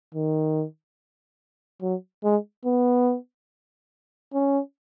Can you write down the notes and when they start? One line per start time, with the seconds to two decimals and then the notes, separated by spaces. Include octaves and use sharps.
0.14 D#3
1.81 F#3
2.24 G#3
2.65 B3
4.34 C#4